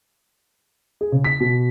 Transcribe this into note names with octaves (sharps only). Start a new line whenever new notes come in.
G#4
C#3
B6
B2